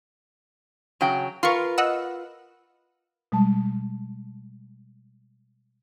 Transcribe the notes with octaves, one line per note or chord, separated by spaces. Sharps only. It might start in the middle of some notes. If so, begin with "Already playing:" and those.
C#3 F#3 G5
F4 A#4 B4 C6 C#6
D#5 F#5 E6
B2 G3 G#3 A5